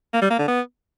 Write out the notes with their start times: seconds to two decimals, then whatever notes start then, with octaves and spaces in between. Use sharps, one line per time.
0.13 A#3
0.22 G3
0.30 A#3
0.39 D3
0.48 B3